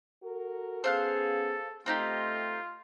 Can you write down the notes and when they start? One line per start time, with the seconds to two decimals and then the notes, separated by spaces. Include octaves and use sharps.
0.23 F#4 A4 A#4
0.84 B3 C#4 G#4 A4 C5 F5 F#6
1.86 A3 C4 D#4 F4 G4